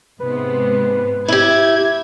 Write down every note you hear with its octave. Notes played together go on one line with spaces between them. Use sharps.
G#2 C3 B3 B4
E4 G4 G#6